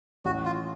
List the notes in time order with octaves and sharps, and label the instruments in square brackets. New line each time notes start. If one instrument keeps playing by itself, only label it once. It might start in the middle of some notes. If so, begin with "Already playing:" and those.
[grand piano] A1 [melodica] F#4
[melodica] F4